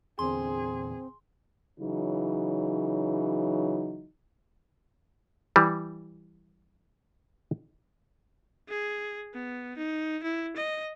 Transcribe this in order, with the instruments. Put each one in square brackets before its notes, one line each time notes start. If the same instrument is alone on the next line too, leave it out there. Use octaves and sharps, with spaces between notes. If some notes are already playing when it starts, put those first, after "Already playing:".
[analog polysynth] E2 A#2 D3 [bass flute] C4 [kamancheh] G#4 [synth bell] C6
[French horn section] C#3 E3 F#3 D#4
[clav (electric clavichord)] E3 G3
[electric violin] G#4
B3
D#4
E4
D#5